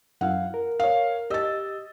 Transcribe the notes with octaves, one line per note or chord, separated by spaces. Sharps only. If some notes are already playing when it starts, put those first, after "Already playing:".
F#2 E4 F5 F#5
A#4
C#5 F5
G4 D#5 E6 A6